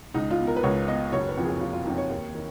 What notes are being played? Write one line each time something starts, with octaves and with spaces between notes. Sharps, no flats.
C#2 D#4
F4
B2
A#4
B4
C#2 C#5
B2 D#5
F#1 C#5
B4
F2 F3
G#4
F#1 F4
F4
F2 F3 D#4
C#5
D#2
D#3